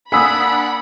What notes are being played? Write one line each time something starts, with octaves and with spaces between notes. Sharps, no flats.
A#3 D4 F#5 G#5 B5 D#6 E6 B6